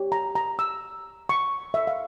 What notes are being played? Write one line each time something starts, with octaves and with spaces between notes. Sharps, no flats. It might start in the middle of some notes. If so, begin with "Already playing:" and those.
Already playing: G4 C#5
A#5
A#5
E6
C#6
E5
F5